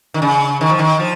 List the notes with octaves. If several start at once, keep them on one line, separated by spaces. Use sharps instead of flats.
D#3
C#3
D#3
F3
D#3
F3